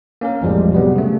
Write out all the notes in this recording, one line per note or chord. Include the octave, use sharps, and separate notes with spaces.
A#3 C#4 A#4
A1 F2 A2 F3 G3 G#3
C3 F#3 G3 B3
C#3 A3